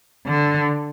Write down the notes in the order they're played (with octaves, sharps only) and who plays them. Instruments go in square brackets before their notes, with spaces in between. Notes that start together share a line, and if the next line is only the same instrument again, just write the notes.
[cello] D3